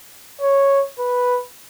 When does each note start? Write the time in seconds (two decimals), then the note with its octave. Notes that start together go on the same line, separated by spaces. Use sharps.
0.41 C#5
0.99 B4